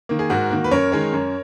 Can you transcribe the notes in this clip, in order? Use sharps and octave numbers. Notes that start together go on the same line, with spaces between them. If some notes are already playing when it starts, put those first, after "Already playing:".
D#3 A#3
G#4
G#2 F#4 A#4
D#3 A#3
B4
F#2 A#4 C#5
D#3 G#3 C#4
F#2